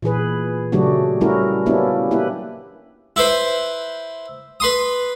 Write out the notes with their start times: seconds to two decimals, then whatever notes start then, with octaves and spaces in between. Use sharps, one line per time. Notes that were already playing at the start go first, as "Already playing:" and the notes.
0.02 A#2 E3 G#4 B4
0.72 C#3 F#3 A3 D4 F#4 G4
1.21 G3 A3 C#4 E4 F#4 A#4
1.66 A#3 B3 C#4 D4 E4 G4
2.11 A#3 E4 G4 B4
3.16 E4 B4 C5
4.60 B4 C6 D#6